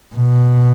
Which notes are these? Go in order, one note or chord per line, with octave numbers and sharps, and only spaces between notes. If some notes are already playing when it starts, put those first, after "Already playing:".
B2